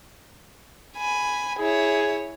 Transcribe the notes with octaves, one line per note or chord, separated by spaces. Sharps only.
G#5 B5
E4 G#4 C#5